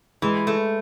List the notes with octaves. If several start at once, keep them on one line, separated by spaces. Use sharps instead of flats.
E3 G#3
A3